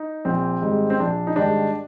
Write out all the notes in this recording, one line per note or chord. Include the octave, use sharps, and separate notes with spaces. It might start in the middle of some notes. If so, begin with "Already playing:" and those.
Already playing: D#4
A#1 C4
G#2 D#3 G3
C4
A#1 D4
D#4
G#2 D#3 G3 D4